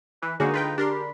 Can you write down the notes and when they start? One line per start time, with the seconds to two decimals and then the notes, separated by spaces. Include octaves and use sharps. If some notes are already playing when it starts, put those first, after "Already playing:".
0.23 E3 B4
0.40 D3 G#3 A#3 D#4 F#4 G#4
0.54 F4 B4 G5
0.78 D4 G4 A#4 C6
0.90 B5